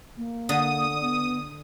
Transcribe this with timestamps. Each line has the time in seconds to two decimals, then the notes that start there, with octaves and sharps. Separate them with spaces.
0.17 A#3
0.49 D3 D#6
1.01 B3